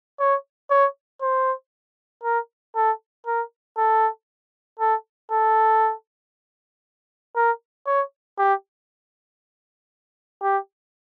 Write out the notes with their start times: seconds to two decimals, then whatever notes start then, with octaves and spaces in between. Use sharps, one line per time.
0.20 C#5
0.70 C#5
1.22 C5
2.23 A#4
2.75 A4
3.26 A#4
3.77 A4
4.79 A4
5.31 A4
7.36 A#4
7.86 C#5
8.38 G4
10.42 G4